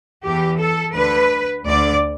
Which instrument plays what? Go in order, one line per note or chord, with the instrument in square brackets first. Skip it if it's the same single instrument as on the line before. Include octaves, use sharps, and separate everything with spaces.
[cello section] E2 E3 G4
A4
D2 D3 B4
D2 D3 D5